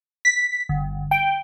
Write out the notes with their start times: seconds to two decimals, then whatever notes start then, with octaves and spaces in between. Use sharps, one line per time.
0.25 B6
0.69 G1
1.11 G5